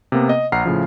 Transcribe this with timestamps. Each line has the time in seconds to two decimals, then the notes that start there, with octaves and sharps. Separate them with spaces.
0.12 C3 A#3 B3
0.29 D#5
0.52 A#1 F#5 A#5 F6 C7
0.65 A2 C#3 F3